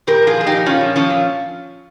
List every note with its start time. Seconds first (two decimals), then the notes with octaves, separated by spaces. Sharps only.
0.07 A#2 G4 A#4
0.22 F3 F4 G#4
0.37 F3 G#4
0.46 D#4 G4
0.52 A#2
0.66 A#2 C#4 F4
0.81 F3
0.96 F3 C#4 F4
1.10 A#2